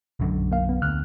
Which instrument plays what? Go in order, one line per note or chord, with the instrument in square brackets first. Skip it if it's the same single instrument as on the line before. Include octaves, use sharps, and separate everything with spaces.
[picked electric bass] B1 F#2 D3
[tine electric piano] A#3 F5
B3
[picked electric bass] D2 [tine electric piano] F6 F#6